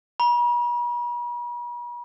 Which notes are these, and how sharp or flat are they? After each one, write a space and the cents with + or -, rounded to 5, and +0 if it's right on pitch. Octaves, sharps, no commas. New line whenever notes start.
B5 -45